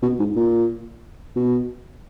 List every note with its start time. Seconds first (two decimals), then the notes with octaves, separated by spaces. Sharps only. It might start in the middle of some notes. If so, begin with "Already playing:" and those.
0.02 B2
0.19 G#2
0.36 A#2
1.36 B2